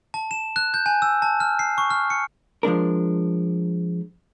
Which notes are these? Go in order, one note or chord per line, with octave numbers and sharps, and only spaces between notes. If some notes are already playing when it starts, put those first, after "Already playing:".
A5
E7
F#6
G6
G#5
E6
A5
F6
C7
C#6
F6
C#7
F3 G#3 D4 A#4